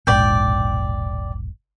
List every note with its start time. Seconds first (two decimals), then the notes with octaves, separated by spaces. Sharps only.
0.07 E1 A#1 G#2 D5 G5